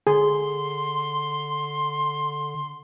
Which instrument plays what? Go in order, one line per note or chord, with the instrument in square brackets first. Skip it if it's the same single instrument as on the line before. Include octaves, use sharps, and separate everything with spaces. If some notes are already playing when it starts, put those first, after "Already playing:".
[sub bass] D3 [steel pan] G#4 [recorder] C6